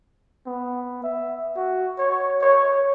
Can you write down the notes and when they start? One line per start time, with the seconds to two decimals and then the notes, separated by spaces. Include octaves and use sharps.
0.46 B3
1.04 E5
1.56 F#4
1.99 C#5
2.41 C#5